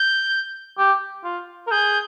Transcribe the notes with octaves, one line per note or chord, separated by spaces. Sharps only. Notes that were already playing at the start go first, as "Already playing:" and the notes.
Already playing: G6
G4
F4
A#4
G#4 G6